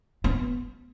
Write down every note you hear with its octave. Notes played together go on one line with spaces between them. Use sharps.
B3